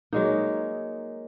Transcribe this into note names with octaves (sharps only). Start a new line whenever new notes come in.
F#3 G#3 A#3 D#4